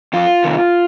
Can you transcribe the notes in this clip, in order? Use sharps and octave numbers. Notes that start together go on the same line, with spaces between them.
F2 F4
C3 D#3